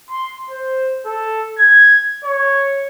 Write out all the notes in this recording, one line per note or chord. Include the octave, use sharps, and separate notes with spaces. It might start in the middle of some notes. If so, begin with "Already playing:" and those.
C6
C5
A4
G#6
C#5